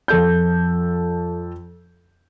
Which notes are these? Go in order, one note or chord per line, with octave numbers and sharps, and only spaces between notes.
F2 A4 G6